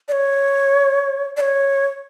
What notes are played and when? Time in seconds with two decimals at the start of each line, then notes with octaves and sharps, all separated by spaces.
0.08 D5
0.12 C#5
1.37 D5
1.41 C#5